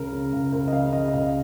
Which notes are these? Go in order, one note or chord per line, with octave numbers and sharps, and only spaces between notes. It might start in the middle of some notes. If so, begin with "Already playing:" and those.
Already playing: C#2 C#3 A#4
C#3
C#2
C#2 A#4
D#5
C#3 F5
C#3 D#5
D#5
C#2 F5